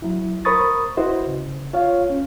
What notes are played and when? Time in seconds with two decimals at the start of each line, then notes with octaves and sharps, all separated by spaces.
0.02 F#3 E4
0.45 A#4 C5 B5 C#6 D#6 A6
0.97 E4 F#4 B4 C5 D#5
1.27 C#3
1.73 F4 C#5 F5
2.10 C#4